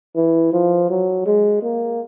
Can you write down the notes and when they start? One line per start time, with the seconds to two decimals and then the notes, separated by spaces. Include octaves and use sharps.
0.16 E3
0.53 F3
0.90 F#3
1.26 G#3
1.63 A#3